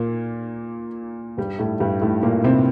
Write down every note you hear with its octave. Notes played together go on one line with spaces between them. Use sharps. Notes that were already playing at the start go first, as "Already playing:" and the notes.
Already playing: A#2 A#3
G2 G3
A2 A3
G2 G3
A2 A3
A#2 A#3
C3 C4